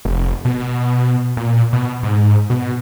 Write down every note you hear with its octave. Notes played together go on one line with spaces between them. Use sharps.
F1
B2
A#2
B2
G#2
B2